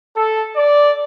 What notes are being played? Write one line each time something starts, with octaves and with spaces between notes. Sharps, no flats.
A4
D5